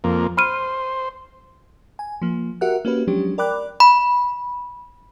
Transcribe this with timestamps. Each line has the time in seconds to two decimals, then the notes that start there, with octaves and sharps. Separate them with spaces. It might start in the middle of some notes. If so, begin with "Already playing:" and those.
0.04 F2 A#3
0.37 C5 B5 F6 D#7
1.99 G#5
2.22 F3 A#3
2.61 F#4 G4 A#4 E5 F#5 F#6
2.85 A#3 C#4 F#4 G4 B4
3.07 F3 F#3 G#3 C#4 D4 G4
3.38 A#4 D5 G5 B5 D6 F#6
3.80 B5